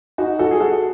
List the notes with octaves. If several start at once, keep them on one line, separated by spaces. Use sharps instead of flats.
D#4 F#4
F#4 A4
G#4
F#4 A4